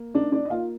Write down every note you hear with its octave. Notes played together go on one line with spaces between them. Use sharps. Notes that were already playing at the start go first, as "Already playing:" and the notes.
Already playing: A#3
D4 D#4 D5
D4 D5
D#5
A#3 F4 F5